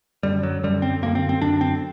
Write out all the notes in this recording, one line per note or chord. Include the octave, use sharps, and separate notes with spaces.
F#2 D3 G3
F#3
F#2 D3 G3
C4
F#2 D3 A#3
C4
C4
F#2 D3 D4
C4